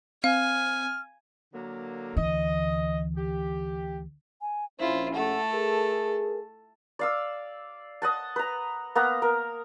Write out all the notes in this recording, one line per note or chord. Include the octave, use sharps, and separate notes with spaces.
C4 F5 G#5 F6
D3 F#3 A#3
D2 E3 D#5
G4
G#5
A#1 C#4 E4 F4 C5
A3 A4 F#5
G#4 A#4
D5 F5 E6
D#5 F#5 A5
B4 A#5
A#3 B3 A#5
A#4